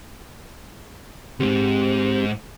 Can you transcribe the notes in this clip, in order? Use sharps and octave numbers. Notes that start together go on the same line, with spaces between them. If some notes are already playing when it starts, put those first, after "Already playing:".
D2 G#2 C4 G4